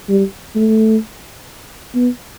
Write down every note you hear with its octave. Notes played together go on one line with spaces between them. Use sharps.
G3
A3
B3